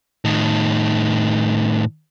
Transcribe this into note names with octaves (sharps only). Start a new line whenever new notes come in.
A2 D#3